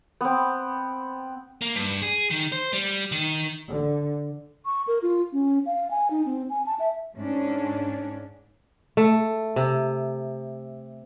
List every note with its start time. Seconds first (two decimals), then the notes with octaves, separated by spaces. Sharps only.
0.21 B3 C4
1.61 A#3
1.75 G2
2.02 G#4
2.31 D#3
2.52 C5
2.73 G3
3.12 D#3
3.68 D3
4.65 C#6
4.87 A#4
5.02 F4
5.33 C#4
5.66 F5
5.91 G#5
6.10 D#4
6.26 C4
6.50 G#5
6.66 A5
6.80 E5
7.17 G#2 C#4 D4
8.97 A3
9.56 C3